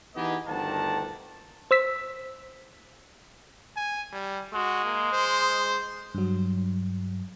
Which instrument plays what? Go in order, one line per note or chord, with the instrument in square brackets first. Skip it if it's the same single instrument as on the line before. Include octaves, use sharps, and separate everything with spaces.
[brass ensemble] E3 B3 D#4 G4 G#4 D#5
G1 D2 D#3 F#5 A5
[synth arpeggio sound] C5 E6 B6
[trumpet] G#5
G3
[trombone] G#3 [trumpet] F#4
[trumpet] A#3
C5
[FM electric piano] G2 F#3